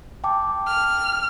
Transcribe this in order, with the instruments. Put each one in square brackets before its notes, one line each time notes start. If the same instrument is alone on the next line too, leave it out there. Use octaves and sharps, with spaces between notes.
[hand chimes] G5 A5 D6
[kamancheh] F6